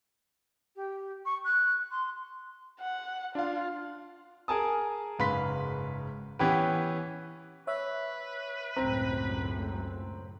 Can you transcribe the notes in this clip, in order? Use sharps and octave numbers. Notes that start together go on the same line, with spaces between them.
G4
C#6
F#6
C6
F#5
D4 F4 F5
G#4 A#4 G#5 A5 D#6
F#1 G#2 B4 F5 C6 B6
E3 B3 C#4 G4 B4
B4 C#5 E5
C#2 F#2 A2 C4 A#5